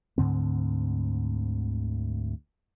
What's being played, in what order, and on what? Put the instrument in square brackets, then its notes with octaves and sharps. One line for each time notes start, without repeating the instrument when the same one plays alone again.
[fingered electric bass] D2 G#2 D3 C4